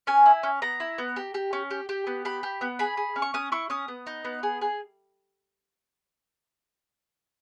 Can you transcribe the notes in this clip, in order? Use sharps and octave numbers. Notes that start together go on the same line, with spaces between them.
C#4 G#5
E4
C#4
B3 A#5
E4
B3
G4
G4
C#4
G4
G4
B3
G4 B5
G4
B3
G#4 B5
G#4
C#4
C#6
C#4 D#6
E4 C#6
C#4 D#6
B3
D#4
B3
G#4
G#4